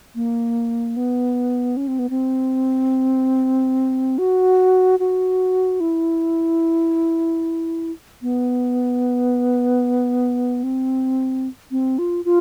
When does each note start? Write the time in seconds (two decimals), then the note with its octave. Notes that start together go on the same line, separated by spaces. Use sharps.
0.15 A#3
0.97 B3
1.77 C#4
1.88 C4
1.99 B3
2.10 C4
4.18 F#4
4.99 F#4
5.80 E4
8.22 B3
10.63 C4
11.71 C4
11.99 F4
12.25 F4